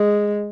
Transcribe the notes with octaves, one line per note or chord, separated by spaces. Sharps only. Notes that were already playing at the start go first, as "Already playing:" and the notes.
Already playing: G#3